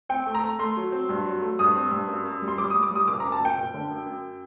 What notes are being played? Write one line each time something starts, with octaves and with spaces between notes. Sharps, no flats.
C4 G5
A3
A#5
A3
A3 C6
F#3
C4
G2
F#3
A3
G2 D#6
C4
G2
F#2
F#2
G3
C6
G3 D6
G3 D#6
D6
G3 D#6
F#1 D6
F#2 A#5
A5
F#1 G5
F#1
D3
F#2
F#2